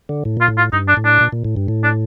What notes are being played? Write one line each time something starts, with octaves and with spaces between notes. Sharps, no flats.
D3
A2
A#2 F4
A2
F4
G2 D#4
D4
A2
D4
A#2
A#2
A2
G2
A2
D4